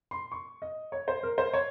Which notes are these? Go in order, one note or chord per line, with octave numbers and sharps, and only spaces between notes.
C6
C#6
D#5
C#5
C5
A#4
C5
C#5